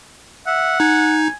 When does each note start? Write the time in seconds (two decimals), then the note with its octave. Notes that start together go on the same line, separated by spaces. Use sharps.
0.47 E5 F#5
0.80 D#4 G#5